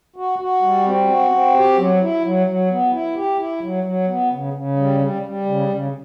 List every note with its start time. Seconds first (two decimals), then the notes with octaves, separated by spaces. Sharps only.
0.16 F#4
0.39 F#4
0.62 G3
0.85 C4
1.08 F#4
1.31 C4
1.54 G4
1.77 F#3
2.00 E4
2.23 F#3
2.47 F#3
2.69 B3
2.93 E4
3.15 G4
3.38 E4
3.61 F#3
3.84 F#3
4.07 B3
4.31 C#3
4.53 C#3
4.76 G3
5.00 G3
5.22 G3
5.46 C#3
5.69 C#3